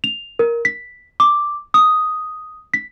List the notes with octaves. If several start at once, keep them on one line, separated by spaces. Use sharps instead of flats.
F7
A#4
B6
D6
D#6
B6